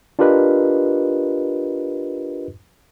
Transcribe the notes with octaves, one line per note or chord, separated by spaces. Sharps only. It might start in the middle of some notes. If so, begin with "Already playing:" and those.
D4 F4 G4 A#4 B4 D#5